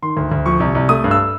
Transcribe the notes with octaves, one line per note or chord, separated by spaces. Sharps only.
D#3 C6
D2
D2
F3 C#6
C2
C2
A3 D#6
G2
E6